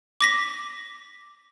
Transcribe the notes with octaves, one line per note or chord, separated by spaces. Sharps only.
D6 A#6 B6